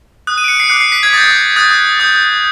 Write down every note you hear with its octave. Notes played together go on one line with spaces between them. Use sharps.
D#6 F#6
D#7
D7
C#7
C7
D6 F#6 C#7
C7
B6
G#6
D#6 G6 A6
D#6 F#6 A6
D#6 G6